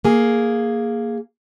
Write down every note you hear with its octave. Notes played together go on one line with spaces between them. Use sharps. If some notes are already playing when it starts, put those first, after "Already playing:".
A#3 G#4